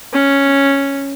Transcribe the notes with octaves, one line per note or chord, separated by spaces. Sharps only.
C#4